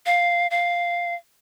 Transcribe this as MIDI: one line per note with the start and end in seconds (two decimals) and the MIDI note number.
0.06 0.47 77
0.51 1.15 77